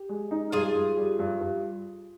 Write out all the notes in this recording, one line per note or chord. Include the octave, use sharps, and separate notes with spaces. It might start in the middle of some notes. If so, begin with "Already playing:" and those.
Already playing: G4
G#3
D#4
G2 F4 G#4
G2
G3
G2
G2